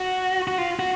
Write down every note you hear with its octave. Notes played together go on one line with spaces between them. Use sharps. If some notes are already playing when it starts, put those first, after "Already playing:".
Already playing: F#4
F#4
F4
F#4